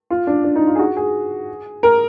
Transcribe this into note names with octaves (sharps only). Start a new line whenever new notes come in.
F4
D4
D4
D#4
F4
G#4
F#4
G#4
A#4